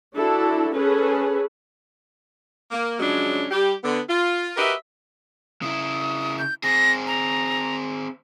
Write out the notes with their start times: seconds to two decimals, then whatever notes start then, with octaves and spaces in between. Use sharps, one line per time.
0.15 D4 E4 F#4 A4
0.75 C#4 G#4 A4 B4
2.71 A#3
3.00 C#3 F3 F#3 G#3 C#4 D4
3.50 G3 G4
3.84 D3 B3
4.08 F4
4.57 F#4 G4 A#4 B4 D#5 E5
5.62 C#3 E4 D#6
6.39 G6
6.63 C4 G#4 A#6
7.07 A#5